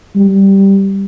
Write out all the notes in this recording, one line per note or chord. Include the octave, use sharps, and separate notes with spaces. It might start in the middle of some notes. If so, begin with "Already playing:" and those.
G3